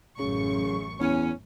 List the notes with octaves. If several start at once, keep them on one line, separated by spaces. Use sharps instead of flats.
A1 F#2 C#3 C#6
E2 C#4